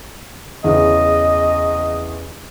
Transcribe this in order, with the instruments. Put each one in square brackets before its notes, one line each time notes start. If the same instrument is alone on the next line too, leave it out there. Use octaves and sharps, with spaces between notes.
[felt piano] E2 C#3 [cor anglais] D#5